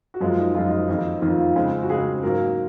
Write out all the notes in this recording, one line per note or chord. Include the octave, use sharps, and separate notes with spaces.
F#4
F#2 F3 G#3 F4
D#4
F#2 F3 G#3 F4
D#4
F4
F2 D#3 A#3 D#4
F2 D#3 A#3 F4
F4
C#3 G#3 C4
F#4
C#3 G#3 C4 G#4
G#2 F#3 A#3 A#4